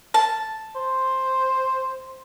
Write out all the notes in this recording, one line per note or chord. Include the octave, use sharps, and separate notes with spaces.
A5
C5